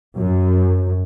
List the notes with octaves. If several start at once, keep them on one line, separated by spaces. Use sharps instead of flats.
F#2